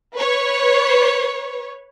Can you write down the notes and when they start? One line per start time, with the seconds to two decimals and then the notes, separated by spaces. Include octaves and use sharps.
0.15 B4 C#5